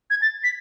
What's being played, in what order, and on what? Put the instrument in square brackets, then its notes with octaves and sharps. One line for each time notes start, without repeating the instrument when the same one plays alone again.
[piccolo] G#6
A6
B6